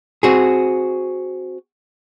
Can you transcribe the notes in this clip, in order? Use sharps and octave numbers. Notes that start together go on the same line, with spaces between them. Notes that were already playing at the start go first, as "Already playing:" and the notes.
C4 F#4 G#4